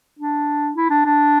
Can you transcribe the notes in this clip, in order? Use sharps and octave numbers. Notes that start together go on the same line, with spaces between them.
D4
E4
D4
D4